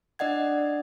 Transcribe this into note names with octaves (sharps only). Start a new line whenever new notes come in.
D4 D5 D#5 F#5 G#6